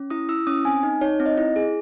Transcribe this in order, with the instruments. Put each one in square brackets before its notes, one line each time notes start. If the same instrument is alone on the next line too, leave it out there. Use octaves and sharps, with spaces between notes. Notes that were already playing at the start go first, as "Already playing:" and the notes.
Already playing: [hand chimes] C#4
E4 D#6
E4 E6
C#4 D#6
C4 G#5
D#4
D#4 C#5
C4
D#5
E4
G#4